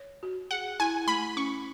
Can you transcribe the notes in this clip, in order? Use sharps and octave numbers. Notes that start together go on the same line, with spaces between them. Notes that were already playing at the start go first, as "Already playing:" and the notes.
Already playing: C#5
F#4
G#4 F#5
E4 G#5
A3 B5
C#4 C#6